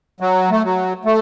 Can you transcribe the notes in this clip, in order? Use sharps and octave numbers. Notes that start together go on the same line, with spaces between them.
F#3
A3
F#3
A3